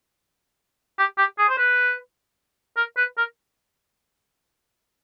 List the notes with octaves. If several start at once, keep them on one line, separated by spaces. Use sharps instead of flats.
G4
G4
G#4
C5
B4
A#4
B4
A#4